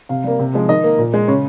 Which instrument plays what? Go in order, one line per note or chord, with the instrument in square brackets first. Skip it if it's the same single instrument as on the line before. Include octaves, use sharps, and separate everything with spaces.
[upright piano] C3 F5
G3 A#3
C3
F3 G#3
D#3 D#5
A#3
A#2
G#3
C#3 C#5